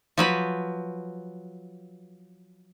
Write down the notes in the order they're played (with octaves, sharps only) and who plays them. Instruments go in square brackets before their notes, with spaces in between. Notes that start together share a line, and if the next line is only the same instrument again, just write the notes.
[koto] F3 F#3 B4